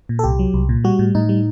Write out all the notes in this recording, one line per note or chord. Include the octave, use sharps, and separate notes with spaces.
A#2
A4
C2 G4
F#3
C2
A#2
G3 F#4
A2
A2 D#4
G3